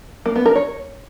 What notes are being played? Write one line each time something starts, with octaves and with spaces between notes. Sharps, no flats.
A#3
B3
A#4
C#5